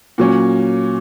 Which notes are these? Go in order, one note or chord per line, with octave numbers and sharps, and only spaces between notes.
A#2 F#3 C#4